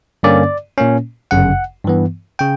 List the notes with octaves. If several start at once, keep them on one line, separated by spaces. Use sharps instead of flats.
G2 D3 A#3 C#4 D5
A#2 A#3 C#4
G1 F#2 C#3 F#5
G2 E3 B3
C#3 G5